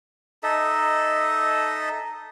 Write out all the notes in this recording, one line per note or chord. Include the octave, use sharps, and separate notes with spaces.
D#4 A4 D#5 E5